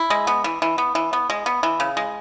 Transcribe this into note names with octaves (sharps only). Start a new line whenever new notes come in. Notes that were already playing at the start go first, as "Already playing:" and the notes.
Already playing: E4
G#3
B3
E3
E3
B3
E3
B3
G#3
B3
E3
C#3
G#3